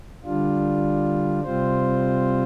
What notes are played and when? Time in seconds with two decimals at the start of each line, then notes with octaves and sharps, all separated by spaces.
0.24 D3 G3 D4 F4
1.43 C3 G3 C4 F4 C5